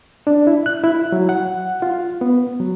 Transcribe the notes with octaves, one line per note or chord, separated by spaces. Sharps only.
D4
E4
F#6
E4
F#3
F#5
F4
B3
F#3